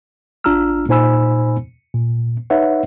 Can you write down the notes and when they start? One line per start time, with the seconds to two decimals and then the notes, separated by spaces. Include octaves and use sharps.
0.44 A1 D4 F4 A#5 E6 F6
0.89 A#2 D#4 C5 G#5 B5 E6
1.94 A#2
2.50 D#4 B4 C#5 E5 F#5